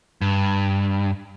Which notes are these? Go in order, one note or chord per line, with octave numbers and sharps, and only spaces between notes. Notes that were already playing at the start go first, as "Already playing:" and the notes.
G2